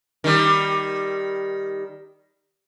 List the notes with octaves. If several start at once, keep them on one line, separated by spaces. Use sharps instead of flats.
D#3 G3